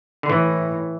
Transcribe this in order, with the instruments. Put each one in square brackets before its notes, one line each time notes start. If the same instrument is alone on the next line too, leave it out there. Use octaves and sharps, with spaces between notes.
[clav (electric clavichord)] D3
[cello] A2 [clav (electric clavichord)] E3